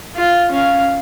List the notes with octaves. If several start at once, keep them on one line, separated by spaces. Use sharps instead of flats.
F4
C#4 F5